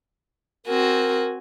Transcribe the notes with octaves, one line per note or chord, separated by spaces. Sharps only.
C4 F#4 A#4 G#5